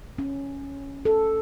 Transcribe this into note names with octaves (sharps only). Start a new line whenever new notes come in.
C#4
A4